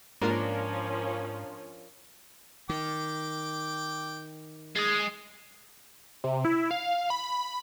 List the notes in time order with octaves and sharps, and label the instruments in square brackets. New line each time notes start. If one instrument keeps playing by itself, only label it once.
[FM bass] G#2 [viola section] F3 C#4 [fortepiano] A#3 [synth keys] D4 F4 A#4
[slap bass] D#3 [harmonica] G5 D6
[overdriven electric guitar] G#3 [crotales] D#6 A6 C7
[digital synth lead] C3
E4
F5
B5